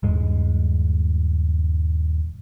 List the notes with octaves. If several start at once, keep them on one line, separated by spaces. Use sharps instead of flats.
D#1 G2 G#3